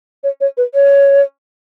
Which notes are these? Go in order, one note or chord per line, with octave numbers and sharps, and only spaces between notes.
C#5
C#5
B4
C#5